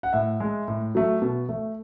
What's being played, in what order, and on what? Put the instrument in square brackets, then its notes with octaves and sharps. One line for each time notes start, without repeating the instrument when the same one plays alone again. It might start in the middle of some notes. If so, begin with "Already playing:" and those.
[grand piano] F#5
A2 E5
G#3
A2
F#3 A3
B2
A3